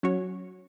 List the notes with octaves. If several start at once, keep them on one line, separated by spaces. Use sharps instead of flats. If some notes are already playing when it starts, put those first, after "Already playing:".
F#3 C#4 F#4 C#5